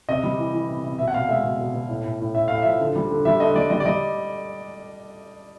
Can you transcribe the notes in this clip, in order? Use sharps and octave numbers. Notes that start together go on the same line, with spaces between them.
C3 D#5
G3
E3
E3
C3
C3
B2 E5
F#5
B2 F5
G#3 E5
B2
B2
B2
A2
A2
A2
A2 E5
A2 F5
F3 E5
D3
G3
D3
G3 E5
D3 D#5
G3 D5
G3 D#5
D5
G3 D#5